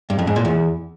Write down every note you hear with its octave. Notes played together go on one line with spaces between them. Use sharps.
G2
F2
G#2
A#2
E2